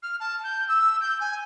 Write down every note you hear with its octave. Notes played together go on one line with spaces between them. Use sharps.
F6
A5
G6
E6
G6
G#5